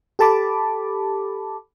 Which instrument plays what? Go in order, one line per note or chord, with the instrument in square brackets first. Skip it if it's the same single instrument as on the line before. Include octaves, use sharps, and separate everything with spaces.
[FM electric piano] G4 A4 A5 B5 D6